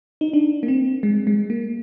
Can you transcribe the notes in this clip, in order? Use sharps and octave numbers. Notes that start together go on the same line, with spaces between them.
D#4
D4
A#3
C4
G#3
G#3
A#3